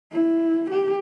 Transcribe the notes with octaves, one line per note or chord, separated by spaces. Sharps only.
E4
G4